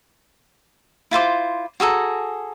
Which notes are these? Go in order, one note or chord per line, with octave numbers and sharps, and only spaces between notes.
E4 F4 C5 D6
F#4 G#4 A4 A#5